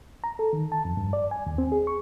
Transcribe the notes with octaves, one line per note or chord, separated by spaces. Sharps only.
A#5
A4
D#3
A5
F2
G2
D5
G#5
D#2
C4
G#4
C#6